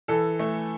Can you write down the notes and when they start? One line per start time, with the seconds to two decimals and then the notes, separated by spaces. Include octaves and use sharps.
0.08 E3 A4
0.39 A3